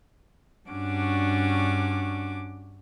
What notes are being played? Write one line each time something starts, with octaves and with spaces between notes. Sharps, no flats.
G2 C#4 D4 F#4 D6